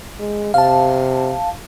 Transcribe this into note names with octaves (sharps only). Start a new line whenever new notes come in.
G#3
C3 F5 A5